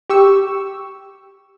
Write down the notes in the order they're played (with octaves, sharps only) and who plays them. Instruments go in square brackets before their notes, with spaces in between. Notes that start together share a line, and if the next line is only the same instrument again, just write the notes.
[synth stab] G4 C#6 E6